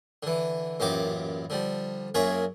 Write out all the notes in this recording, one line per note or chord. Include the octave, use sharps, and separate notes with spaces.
D3 E3
A1 F#2 A#2 G4 D6
D3 F3 G3
F#2 A#3 F4 G#4 C#5 E5